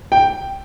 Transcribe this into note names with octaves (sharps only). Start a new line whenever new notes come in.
G5